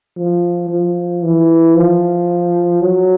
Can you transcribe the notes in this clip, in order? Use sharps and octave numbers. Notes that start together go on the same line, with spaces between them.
F3
F3
E3
F3
F#3